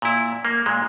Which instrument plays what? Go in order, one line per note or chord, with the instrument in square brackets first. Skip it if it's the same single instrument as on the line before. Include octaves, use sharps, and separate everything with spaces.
[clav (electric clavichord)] A#2 E4
A#3
A#2 G#3